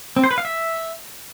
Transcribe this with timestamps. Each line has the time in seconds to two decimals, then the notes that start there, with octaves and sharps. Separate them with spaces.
0.16 C4
0.24 C5
0.31 B4
0.38 F5
0.45 E5